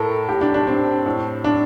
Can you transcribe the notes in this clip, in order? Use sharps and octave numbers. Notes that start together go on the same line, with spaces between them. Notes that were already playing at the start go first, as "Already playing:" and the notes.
Already playing: A2 A4 A#4
A2 G4
D4
D4
C4
A2
D4